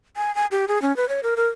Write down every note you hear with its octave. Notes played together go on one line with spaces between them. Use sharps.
G#5
G#5
G4
G#4
C#4
B4
C#5
A#4
A#4